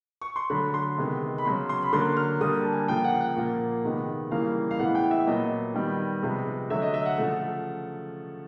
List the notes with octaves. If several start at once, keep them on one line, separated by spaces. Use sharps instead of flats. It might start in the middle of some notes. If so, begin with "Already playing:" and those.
C#6
C6
D3 F#3 A3 B5
C6
C3 D#3 G#3 B3
B5
C#3 F#3 B3 C6
C6
B5
D3 F#3 A#3 C6
F6
D3 G3 A#3 D#6
A5
G#5
C#3 F3 A#3 G5
F#5
F#5
A#2 F3 A#3
C3 D#3 G#3 B3
C#3 E3 G3 A#3 F5
F5
A2 E3 G#3 B3 F#5
G5
E5
A#2 F#3 B3 D#5
D#3 G3 B3
C3 F3 G#3 B3
D3 F#3 A3 E5
D#5
E5
F#5
C#3 F3 A3